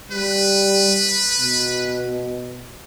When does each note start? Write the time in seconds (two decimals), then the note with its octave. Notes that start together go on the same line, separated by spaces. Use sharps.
0.12 G3 B4
1.39 B2